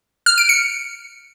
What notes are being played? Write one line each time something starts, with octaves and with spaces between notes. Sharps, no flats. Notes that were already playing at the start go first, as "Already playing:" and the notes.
F6
D7
C#7